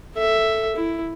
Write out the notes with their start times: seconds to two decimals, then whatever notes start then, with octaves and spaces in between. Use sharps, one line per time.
0.15 A4 E5
0.76 E4